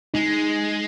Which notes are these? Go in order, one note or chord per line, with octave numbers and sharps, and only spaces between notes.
G#3 D#4